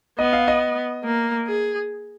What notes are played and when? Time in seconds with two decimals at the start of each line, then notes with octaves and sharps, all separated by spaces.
0.19 B3 D#5
0.33 F5
0.48 D#5
1.04 A#3
1.47 G#4